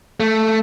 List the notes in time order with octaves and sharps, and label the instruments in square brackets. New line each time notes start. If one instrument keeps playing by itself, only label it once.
[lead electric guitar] A3